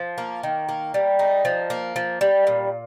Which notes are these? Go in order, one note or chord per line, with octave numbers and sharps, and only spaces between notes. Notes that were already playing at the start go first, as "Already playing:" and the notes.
Already playing: F3
A#3
D#3
A#3
G3
D#4
F3
A#3
F3
G3
A#2